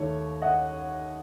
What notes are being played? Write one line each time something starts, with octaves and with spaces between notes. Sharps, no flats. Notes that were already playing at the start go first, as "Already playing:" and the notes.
Already playing: D#2 D#3 A3 C#5
D#5 F#5